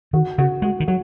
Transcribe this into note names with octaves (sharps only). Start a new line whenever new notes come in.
D#3 F#4
C#3 F#4
G#3 F#4
D#3
F#3 F#4